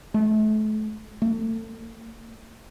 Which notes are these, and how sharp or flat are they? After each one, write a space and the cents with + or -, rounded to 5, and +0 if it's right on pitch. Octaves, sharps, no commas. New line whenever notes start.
A3 -35
A3 +35